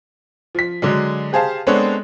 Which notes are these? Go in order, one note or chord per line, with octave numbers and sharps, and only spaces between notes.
F3 B6
D3 F#3 G#3
G4 G#4 C5 F5 A5
G#3 B3 C4 D4 A4 C#5